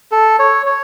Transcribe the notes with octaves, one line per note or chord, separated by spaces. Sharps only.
A4
C#5
C#5